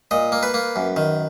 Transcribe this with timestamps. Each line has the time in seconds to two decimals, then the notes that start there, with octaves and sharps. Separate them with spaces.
0.11 A#2 D#5
0.32 A#3
0.43 B4
0.54 A#3
0.76 F#2
0.96 D#3